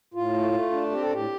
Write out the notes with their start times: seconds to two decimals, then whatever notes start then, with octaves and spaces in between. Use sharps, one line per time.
0.14 A2 F4
0.33 A3
0.52 A3
0.71 D4
0.91 C4 G4
1.01 A4
1.10 A2 G4